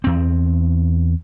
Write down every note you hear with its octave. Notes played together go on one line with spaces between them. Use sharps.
E2 C4